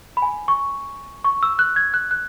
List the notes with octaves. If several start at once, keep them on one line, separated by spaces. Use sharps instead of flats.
B5
G#5
C#6
C#6
E6
F#6
G#6
F#6
F#6